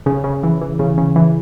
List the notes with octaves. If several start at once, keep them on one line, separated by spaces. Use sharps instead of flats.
C#3
C#3
E3
E3
C#3
C#3
E3